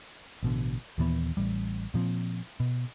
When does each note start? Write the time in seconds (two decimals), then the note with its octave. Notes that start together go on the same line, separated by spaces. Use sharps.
0.43 A1 B2 D3
0.98 D#2 A#2 E3 B3
1.37 A1 G3
1.94 A#2 F3 C4
2.60 B2